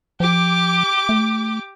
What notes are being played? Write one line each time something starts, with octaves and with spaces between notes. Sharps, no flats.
F3 G4 D6
A3